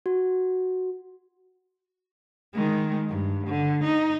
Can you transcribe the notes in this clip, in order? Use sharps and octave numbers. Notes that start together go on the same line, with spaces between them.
F#4
D#3 G#3
G2
D3
D#4